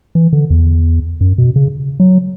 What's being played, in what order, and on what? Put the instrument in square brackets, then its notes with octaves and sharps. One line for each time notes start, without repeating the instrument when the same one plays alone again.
[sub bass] E3
D3
E2
F#2
B2
C#3
F#3